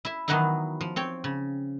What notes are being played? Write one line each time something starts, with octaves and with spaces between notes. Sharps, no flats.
E4 E5
D#3 E3 F#3 B3 D#4 E4
F3
C4 C#5 G5
C#3